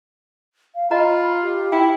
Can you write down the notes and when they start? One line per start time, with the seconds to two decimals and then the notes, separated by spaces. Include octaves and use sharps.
0.75 F5
0.91 F4 D#5 A#5 B5
1.42 G4
1.72 E4 G5